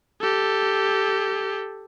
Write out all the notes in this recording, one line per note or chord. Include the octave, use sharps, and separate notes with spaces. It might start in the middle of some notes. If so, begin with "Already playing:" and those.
G4 A4